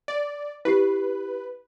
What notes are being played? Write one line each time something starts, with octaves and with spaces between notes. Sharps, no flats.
D5
E4 G4 B4 C7